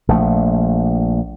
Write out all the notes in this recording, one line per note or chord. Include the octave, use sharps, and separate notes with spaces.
A#1 F3 A3